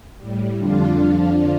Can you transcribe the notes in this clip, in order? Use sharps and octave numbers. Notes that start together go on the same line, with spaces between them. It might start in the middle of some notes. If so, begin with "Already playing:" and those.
A2 G3
F2 D3 G3 D4 F4
F2 D3 F3 D4 F4